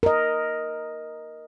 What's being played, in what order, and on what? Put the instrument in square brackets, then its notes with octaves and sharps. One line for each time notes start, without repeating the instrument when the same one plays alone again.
[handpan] A#4 D#5